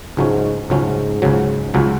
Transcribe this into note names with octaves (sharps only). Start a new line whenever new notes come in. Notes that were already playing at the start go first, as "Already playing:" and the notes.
C#2 G#2 C#3 F#3 A3 C#4
C#2 G#2 C#3 F#3 A3 C#4
C#2 C#3 F#3
C#2 C#3 F#3